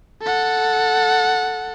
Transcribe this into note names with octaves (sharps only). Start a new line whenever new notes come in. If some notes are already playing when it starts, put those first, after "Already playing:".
A4 F#5